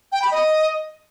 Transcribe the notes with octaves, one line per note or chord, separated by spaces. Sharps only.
G5
B5
D#5